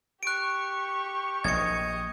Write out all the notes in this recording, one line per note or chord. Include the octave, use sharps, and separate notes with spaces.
G4 C#6 F#6 D7
A#1 D#5 G#6 C#7